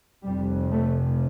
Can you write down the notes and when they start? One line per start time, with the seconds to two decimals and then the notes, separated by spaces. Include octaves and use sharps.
0.24 F1 F2 C3 G3
0.71 A3